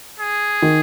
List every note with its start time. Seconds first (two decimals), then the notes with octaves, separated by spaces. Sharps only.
0.20 G#4
0.62 D#3